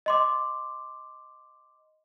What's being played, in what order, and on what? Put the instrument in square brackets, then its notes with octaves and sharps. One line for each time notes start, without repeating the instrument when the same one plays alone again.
[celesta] D#5 C6 D6